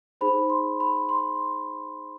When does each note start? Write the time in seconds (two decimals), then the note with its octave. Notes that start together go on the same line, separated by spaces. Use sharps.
0.21 D#4 G#4 C5 B5
0.50 C6
0.80 B5
1.09 C6